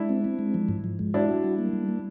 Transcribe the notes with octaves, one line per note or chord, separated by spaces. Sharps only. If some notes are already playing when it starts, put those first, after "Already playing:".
Already playing: G#3 D4 E4
C4
C4
G#3
F3
G#2
F3
G#3
D4 E4 F#4
F#4
G3
A#3
G3
A#3